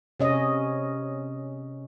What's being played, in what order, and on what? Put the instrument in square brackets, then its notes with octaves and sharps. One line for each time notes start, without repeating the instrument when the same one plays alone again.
[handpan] C3 C#4 D#5